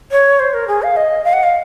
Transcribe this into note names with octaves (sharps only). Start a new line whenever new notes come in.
C#5
C5
A#4
G#4
F5
D#5
F5
F#5
F5